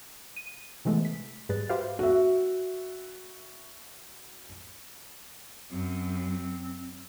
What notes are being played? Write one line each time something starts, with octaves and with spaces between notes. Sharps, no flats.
D#7
C3 E3 G#3 A3 B3
B6
G#2 G3 G#4 B4 A6
F#4 G4 B4 C5 E5 F5
F#4 E5
F#2 C4